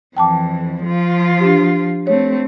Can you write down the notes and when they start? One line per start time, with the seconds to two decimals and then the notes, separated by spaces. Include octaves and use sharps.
0.17 F2 E3 G5 A5 D6
0.84 F3 F4
1.40 D4 G4
2.07 A3 C4 C#5